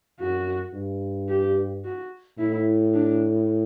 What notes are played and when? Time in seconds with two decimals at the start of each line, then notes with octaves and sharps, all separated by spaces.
0.20 F#2 F#4
0.74 G2
1.29 G4
1.84 F#4
2.39 A2 E4
2.94 D4